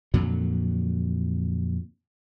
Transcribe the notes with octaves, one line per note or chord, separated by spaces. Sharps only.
F2 A#2 D3 F#3